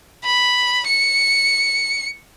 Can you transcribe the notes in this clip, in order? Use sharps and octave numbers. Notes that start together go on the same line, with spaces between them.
B5
C#7